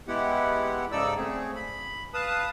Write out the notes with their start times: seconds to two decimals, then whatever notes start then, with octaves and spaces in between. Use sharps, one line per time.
0.08 G#3 B3 E4 G4 F#5
0.92 G#2 C#3 D#4 A4 D5 E6
1.17 A3 C4 G#4
1.56 B5
2.14 B4 F5 A5 D#6